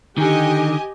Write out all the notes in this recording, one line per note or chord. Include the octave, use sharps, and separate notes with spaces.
D3 D#3 G4 D#5 G#5